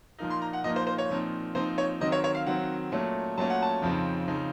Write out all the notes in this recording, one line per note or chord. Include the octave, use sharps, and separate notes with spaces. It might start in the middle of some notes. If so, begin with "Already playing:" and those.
A#2 F3 A#3 D#4
C6
A#5
F#5
A#2 F3 A#3 D#4 D#5
C5
C5
C#5
A#2 F3 C4 D#4
A#2 F3 C4 D#4 C5
C#5
D#3 F#3 C4 D#5
C#5
C#5
F5
D#3 F#3 C4 F#5
A#2 F#3 A3 C#4
A#2 F#3 A3 C#4 A5
F#5
A5
F2 C#3 F3 C4 D#4
C#3 F3 C4 D#4